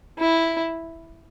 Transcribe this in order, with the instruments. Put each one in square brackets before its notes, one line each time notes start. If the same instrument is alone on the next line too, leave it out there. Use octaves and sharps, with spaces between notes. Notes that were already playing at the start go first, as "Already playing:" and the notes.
[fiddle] E4